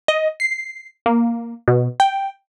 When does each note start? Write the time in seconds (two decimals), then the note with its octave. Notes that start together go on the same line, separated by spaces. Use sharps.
0.08 D#5
0.40 C7
1.06 A#3
1.68 B2
2.00 G5